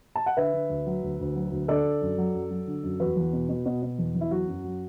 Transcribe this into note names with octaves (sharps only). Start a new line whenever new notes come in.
A5
F#5
D3 B4 E5
D3
D2
F#3
D2
D2
F#3
D2
D3 A4 D5
D3
F#2
F#3
F#2
F#3
D3
F#2
E2 F#4 B4
E2
B2
B2
B2
B2
E2
E2
E4
F#3 F#4
F#2
F#3